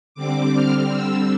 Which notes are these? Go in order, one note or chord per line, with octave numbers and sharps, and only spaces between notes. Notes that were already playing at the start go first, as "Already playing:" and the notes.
D3 G3 C4 D6
F6
E6